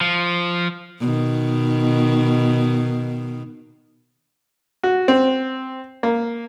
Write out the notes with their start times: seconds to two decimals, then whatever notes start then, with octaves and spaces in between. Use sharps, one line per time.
0.01 F3
1.00 B2 D#3
4.83 F#4
5.08 C4
6.03 A#3